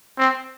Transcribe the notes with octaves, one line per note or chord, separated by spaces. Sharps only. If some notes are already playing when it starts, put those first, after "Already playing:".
C4